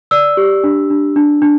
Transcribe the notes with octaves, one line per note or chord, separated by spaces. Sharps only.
D5 E6
G4
D4
D4
D4
D4